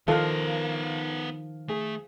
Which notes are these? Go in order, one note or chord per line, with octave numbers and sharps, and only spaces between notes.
D#3 F3 B3 A4 F5 F6
A3 G#4